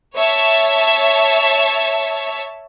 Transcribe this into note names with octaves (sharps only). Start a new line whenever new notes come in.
C#5 E5 A5